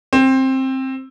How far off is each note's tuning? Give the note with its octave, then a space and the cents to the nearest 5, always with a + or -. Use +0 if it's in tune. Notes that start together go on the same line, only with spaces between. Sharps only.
C4 +15